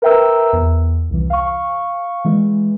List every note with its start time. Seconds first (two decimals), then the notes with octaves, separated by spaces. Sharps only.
0.02 A#4 B4 E5 G5 A#5 E6
0.53 E2
1.10 C2 E3
1.30 F5 C#6
2.25 E3 G#3